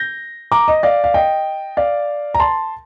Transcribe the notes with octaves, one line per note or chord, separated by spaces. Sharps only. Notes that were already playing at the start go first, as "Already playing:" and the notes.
Already playing: G6 A#6
A#5 D6
D#5
D5 F5
F5
D#5 G5
D5 F5
A#5
A5 C6